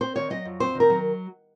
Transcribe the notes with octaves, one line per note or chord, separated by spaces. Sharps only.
C4 C5
D#3 C#5
F#3 D#5
F2
C4 C5
D#3
A#4
F#3